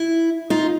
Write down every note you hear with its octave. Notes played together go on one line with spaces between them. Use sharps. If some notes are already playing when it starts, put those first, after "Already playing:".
Already playing: E4
D#4 F4